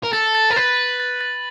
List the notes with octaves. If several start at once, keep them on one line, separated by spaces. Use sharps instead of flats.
A#4
A4 A6
A6
A#4
B4 A6
F#7
A6
A6